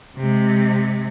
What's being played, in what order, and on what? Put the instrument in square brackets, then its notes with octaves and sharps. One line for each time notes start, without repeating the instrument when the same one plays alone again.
[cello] C3 G#3